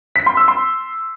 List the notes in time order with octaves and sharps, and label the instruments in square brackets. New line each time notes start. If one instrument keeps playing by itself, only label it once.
[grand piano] B6
C6
E6
C6